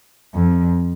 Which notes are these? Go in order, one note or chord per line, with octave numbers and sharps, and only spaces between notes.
F2